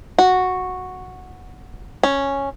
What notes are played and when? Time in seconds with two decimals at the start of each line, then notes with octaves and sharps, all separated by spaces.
0.19 F#4
2.03 C#4